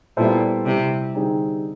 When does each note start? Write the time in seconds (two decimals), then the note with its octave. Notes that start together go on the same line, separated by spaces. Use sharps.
0.17 A#2 G3 B3 E4 A4 C5
0.66 C3 G3 C4 E4 G4
1.14 D3 G3 C4 D#4 G#4